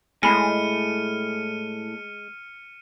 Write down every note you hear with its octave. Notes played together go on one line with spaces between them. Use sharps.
A2 G#3 G#5 B5 F6 C7 C#7 D#7